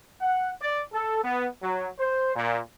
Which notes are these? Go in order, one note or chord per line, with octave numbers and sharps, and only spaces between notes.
F#5
D5
A4
B3
F#3
C5
A#2